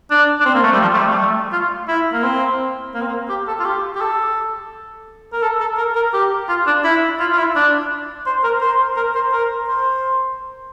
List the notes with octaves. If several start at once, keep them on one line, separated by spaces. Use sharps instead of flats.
D4
D4
C4
A#3
A3
G3
F3
A3
G3
G3
A3
F4
E4
A#3
C4
A#3
C4
A#3
G4
A4
F4
G4
G4
A4
A#4
A4
A4
A#4
A#4
G4
F4
D4
E4
F4
F4
E4
D4
C5
A#4
C5
A#4
C5
A#4
C5